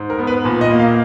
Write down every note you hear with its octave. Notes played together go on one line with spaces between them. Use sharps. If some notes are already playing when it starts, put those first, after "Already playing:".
Already playing: G#2
A#4
B3
B4
A#2
D#5
A#3
F5